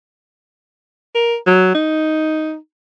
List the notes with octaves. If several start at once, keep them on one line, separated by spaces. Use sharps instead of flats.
A#4
F#3
D#4